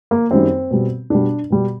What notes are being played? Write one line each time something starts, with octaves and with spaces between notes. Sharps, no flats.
A#3
F#2 D#3 G3 C4
B2 G3
B2 G3 D4
B2 G3